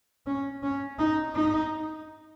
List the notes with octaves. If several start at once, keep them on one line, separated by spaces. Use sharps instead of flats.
C#4
C#4
D#4
D#4